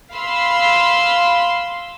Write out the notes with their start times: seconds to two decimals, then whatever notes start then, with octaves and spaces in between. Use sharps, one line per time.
0.14 F5 B5 C6 E6